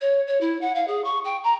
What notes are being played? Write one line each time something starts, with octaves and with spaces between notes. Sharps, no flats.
C#5
C#5
E4
F#5
F5
G#4
C#6
G5
A#5